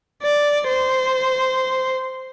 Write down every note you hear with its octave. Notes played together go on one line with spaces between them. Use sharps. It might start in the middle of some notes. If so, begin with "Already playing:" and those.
D5
C5